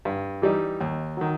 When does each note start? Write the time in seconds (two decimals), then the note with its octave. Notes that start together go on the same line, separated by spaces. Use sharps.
0.05 G2
0.42 E3 G3 D#4
0.81 D#2
1.17 D#3 F#3